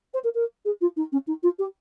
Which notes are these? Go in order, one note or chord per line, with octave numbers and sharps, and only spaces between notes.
C5
A#4
A#4
G#4
F4
D#4
C#4
D#4
F4
G4